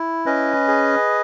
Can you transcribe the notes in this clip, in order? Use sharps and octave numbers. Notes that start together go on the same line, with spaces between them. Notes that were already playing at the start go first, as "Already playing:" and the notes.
Already playing: E4
C#4 B4 D#5
G#4